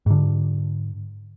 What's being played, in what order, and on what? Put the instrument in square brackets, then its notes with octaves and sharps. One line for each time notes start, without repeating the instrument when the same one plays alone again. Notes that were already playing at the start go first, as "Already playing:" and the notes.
[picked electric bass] G#2 D3